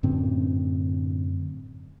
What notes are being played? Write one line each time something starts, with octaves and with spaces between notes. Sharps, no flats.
F#2 A2 D3 C4